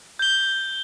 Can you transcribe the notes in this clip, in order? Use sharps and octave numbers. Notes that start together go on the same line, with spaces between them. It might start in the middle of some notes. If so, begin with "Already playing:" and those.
G6 G7